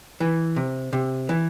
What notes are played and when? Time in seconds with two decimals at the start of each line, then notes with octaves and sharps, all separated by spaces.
0.20 E3
0.56 C3
0.93 C3
1.29 E3